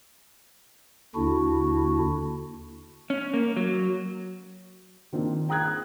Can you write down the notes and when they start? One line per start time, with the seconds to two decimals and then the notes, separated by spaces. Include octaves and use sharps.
1.15 D#2 D3 D4 E4 F#4
3.10 C#4
3.34 A#3
3.57 F#3
5.13 D#3 F3 A#3 C4 D4 F4
5.49 G5 A#5 D#6 F#6 G#6